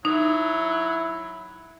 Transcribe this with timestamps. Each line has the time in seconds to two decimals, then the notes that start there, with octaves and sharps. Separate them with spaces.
0.05 F#3 D#4 E4